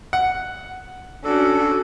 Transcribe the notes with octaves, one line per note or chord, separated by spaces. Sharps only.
F#5
C#4 D4 F#4 A4